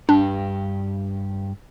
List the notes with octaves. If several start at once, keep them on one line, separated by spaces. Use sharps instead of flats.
G2 D4 G4